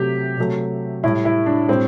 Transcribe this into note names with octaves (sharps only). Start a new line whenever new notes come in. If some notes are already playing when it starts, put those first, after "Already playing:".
Already playing: C3 F#3 A3 G4
C3 F#3 A3
A2 G3 E4
E4
D4
A2 G3 C4